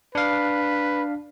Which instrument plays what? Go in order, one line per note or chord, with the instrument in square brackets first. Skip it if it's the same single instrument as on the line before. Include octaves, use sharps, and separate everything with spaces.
[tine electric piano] D4 F5 [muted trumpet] B4